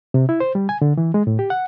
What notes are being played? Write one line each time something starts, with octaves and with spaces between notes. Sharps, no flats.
C3
E4
C5
G3
G#5
D3
E3
G#3
A2
G4
F#5